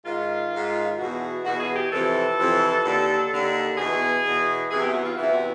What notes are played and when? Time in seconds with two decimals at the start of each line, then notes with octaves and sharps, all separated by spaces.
0.05 G#2 D#3 F4
0.52 G#2 D#3
0.98 E2 B2 F#4
1.45 E2 B2 F#4
1.60 G#4
1.76 G4
1.91 F2 C3 E3 A4
2.38 F2 C3 E3
2.84 D#2 D3
3.31 D#2 D3
3.77 E2 B2 G#4
4.24 E2 B2
4.70 E2 C3 E3 G#4
4.82 G4
4.94 F#4
5.05 F4
5.16 E2 C3 E3 E4
5.32 F#4